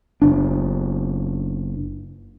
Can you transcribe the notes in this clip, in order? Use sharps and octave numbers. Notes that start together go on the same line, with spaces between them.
F#1 D4